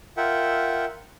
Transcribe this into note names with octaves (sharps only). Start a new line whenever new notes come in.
F4 A#4 E5 F#5 G5